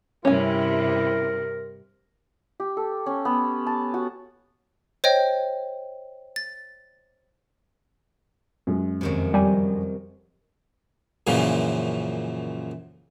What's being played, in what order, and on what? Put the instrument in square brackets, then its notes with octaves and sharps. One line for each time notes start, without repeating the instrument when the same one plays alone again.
[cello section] G2 C3 [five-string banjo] C#4 G#5 [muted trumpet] E4 [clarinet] A#4
[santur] G4
A4
C#4
B3
A5
F#4
[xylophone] C5 C#5 D#5 G5
A6
[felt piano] F#2 G#3
[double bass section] F2 [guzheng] C3 D#3 F#3
[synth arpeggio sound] G3 G#5
[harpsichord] F#2 A#2 C#3 E3 F3